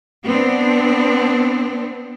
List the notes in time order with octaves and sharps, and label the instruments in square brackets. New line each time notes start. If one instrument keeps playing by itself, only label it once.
[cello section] B3 C4 D4